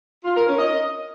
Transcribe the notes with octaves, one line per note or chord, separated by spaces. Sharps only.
F4
A#4
C#4
D#5